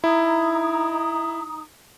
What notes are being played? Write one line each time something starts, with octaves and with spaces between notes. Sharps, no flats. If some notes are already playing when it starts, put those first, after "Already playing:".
D#4 E4 A#5 D#6